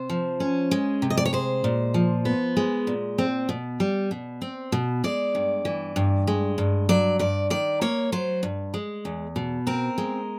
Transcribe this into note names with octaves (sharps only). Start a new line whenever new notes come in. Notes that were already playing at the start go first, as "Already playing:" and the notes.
Already playing: C3 C5
F3
C#4
G#3
C3
D#5
D5
C#5
G#3 C5
A#2
F3
B3
G#3
A#2
C4
B2
G3
B2
C4
B2
G#3 D5
G2
E3
G2
G#3
G2
F#3 D5
G2 D5
D#3 D5
A#3 C#5
F#3 C5
G2
G#3
E2
B2
C4 A#4
G#3